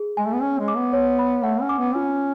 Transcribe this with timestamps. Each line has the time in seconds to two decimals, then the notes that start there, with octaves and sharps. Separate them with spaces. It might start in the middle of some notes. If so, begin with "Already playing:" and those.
Already playing: G#4
0.17 G#3 G#5
0.26 A3
0.34 B3
0.42 C#4 C#5
0.59 G#3
0.68 D6
0.76 B3
0.93 C#5
1.19 B5
1.43 A3 F#5
1.61 C#4
1.69 D6
1.78 B3
1.95 C#4 F4